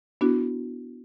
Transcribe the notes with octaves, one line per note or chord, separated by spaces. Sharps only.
B3 D4 E4 F#4